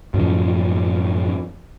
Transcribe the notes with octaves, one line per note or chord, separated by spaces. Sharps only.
F#2 A2 C#3 F3